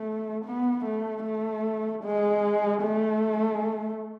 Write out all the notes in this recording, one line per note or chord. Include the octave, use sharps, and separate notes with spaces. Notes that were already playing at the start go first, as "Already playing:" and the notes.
Already playing: A3
B3
A3
A3
G#3
A3